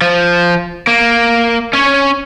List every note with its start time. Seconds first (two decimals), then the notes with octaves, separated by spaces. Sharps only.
0.01 F3
0.87 A#3
1.73 C#4 C#5